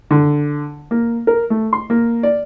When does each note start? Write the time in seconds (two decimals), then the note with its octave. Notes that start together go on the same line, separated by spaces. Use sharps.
0.11 D3
0.91 A#3
1.27 A#4
1.50 A3
1.73 C6
1.90 A#3
2.23 D5